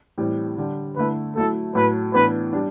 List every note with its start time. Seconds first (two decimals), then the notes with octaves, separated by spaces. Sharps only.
0.18 A2 E3 G3 C4
0.57 D3 G3 D4
0.96 D3 A3 E4 B4
1.36 F#3 A3 E4 A4
1.75 A2 F#3 A3 B4
2.14 A2 E3 B3 D4 B4
2.53 G3 D4